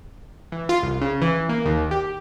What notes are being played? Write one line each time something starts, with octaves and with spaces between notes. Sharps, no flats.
E3
F4
C2
C#3
E3
A#3
D#2
G4